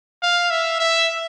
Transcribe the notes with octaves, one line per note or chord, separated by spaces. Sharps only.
F5
E5
E5